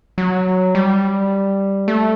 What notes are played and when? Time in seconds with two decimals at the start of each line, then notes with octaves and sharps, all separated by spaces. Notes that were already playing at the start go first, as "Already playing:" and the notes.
0.18 F#3
0.75 G3
1.88 A3